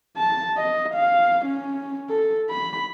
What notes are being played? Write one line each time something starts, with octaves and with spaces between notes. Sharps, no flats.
A5
D#5
F5
C#4
A4
B5